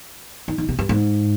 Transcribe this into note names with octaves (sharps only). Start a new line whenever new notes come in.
D#3
D#3
C3
G2
G#2